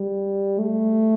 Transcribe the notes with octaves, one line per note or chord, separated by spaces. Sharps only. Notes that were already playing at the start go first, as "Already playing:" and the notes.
Already playing: G3
A3